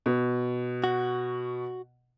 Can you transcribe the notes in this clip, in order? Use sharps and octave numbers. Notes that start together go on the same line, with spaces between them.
B2
F#4